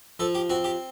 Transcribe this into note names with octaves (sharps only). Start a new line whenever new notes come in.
F3 A4
G4
C4 F#4
G4